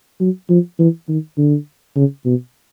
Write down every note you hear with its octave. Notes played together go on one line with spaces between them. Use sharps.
F#3
F3
E3
D#3
D3
C#3
B2